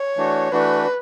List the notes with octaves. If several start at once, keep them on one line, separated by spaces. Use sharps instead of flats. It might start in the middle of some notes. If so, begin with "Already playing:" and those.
Already playing: C#5
E3 A3 D4 F#4
E3 A3 D4 F#4 B4